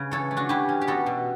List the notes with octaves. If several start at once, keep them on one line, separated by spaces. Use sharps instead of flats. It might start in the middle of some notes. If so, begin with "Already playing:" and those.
Already playing: C#3 B4
E3 A4 C#5
A3
D4 F#4
E3 E4 G4
C#4
G4
B3 F#4 A4
B2